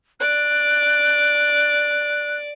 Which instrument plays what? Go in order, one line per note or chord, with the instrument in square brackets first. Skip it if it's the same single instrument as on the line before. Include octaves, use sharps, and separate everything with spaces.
[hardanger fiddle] D5 [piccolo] F#6